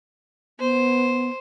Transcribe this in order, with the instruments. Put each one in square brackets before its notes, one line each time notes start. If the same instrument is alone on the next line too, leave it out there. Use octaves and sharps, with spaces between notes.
[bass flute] B3 [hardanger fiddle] C5